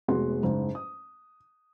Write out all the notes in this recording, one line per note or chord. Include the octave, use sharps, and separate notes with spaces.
F1 G#3 B3 F#4 F#5 C6
F#1 G#2
D#6